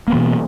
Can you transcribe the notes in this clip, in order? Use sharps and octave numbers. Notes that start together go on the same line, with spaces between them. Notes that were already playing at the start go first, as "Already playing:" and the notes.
B2 E3 A#3 B3